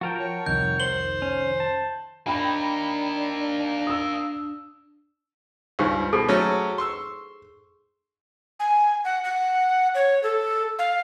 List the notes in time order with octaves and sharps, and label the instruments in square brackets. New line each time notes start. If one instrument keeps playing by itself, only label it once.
[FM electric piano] F3 A5 [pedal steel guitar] F#4 A#4 G5
[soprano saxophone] C#5
[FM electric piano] C2 F2 D#3 [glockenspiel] G6
[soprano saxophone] C5 [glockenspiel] F#7 G7
[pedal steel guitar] C#4
A5
[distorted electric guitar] A#3 D#4 [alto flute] D4 [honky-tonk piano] G5 B5
[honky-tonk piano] D#6 E6
[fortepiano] C#2 G2 [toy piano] D#4 G4 C5
[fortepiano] B2 [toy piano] G#4 A4 C5
[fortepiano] F#3 A3 C#4
C6 C#6 E6
[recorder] G#5
F#5
F#5
C#5
A4
F5